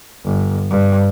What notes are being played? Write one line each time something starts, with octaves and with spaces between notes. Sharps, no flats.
G1
G2